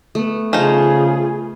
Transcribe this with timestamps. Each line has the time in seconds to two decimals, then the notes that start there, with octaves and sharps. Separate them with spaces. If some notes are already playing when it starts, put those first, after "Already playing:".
0.15 A3 B3
0.53 C#3 F3 D#4 F4 G#4